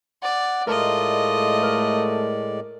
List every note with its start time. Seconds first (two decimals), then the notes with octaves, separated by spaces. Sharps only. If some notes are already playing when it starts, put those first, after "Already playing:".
0.23 D5 F#5
0.67 A2 G#3 A3 F4 A#4 D5 D#5
1.62 A#4